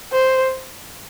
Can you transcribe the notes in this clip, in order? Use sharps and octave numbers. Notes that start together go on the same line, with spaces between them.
C5